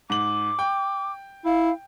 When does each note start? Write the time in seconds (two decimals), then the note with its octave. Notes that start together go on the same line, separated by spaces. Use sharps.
0.10 G#2 D6 F#7
0.59 G5
1.45 E4 F5